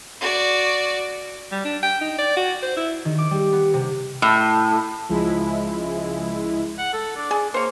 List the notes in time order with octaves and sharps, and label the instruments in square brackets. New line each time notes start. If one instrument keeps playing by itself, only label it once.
[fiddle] F#4 D5
[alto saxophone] G3
D4
G5
D#4
D5
F#4
C5
E4
[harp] D#3
D6
G3
B3
C3
[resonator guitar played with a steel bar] A2
[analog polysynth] C#2 G#3 E4 [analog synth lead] F3
[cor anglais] F#5
A4
D4
[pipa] G#4
[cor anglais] A#3 [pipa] C5 C#5